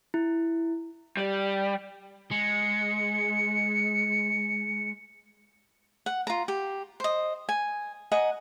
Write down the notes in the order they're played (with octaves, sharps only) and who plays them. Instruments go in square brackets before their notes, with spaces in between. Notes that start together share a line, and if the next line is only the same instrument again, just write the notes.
[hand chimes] E4
[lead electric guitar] G3
[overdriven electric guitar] G#3 [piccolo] C#7
[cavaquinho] F#5
F4 A#5
G4
C5 D#5
G#5
D#5 F#5 G#5 A#5